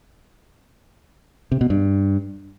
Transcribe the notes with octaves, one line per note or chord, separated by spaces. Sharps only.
C3
B2
G2